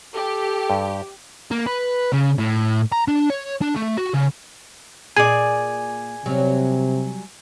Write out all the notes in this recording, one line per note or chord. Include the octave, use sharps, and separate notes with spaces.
G4 A4
G2
A#3
B4
C#3
A2
A#5
D4
C#5
D4
A3
F#4
C#3
A#2 G#4 D5 G#5
C3 F#3 G3